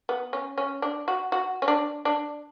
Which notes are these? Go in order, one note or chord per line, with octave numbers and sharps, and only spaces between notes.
B3
C#4
C#4
D4
F#4
F#4
C#4
D4
D4